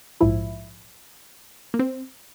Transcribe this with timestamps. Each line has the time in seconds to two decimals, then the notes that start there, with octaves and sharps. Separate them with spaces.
0.21 A#1 G#2 F3 E4
1.74 A#3
1.79 C4